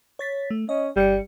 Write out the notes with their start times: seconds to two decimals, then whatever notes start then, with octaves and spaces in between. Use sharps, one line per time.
0.19 C#5 A6 B6
0.50 A3
0.69 C#4 D#5
0.96 G1 G3 C#7